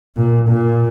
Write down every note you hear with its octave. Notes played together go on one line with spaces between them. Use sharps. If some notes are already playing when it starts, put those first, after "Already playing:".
A#2
A#2